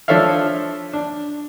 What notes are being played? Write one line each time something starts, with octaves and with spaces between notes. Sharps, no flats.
F3 D4 A4 C#5 E5 F5
D4